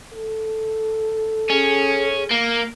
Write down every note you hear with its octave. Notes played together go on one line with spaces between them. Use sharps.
A4
C#4 G#4
A#3